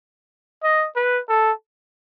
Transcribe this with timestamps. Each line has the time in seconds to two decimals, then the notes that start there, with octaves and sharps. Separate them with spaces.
0.63 D#5
0.96 B4
1.29 A4